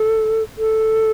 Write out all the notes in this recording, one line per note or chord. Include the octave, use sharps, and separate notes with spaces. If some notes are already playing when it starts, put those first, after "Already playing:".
Already playing: A4
A4